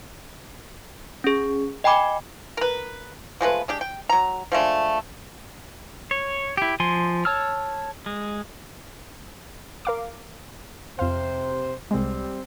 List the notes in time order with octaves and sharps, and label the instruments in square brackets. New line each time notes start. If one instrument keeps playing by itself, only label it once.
[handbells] C#4 G#4
D#5 G5 G#5 B5 D6
[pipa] A#4 B4
F3 G#3 A3 B4
G#3 D4 G4
G5
F#3 A#5
F3 G#3 A3 D4
[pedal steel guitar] C#5
E4 G4
F3 G#5 C6
C#5 A5 E6 F6
G#3
[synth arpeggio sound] A#4 F5 D6
[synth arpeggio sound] F2 F5 [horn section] C3 C5
[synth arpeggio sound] C2 G#3 [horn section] G3 C4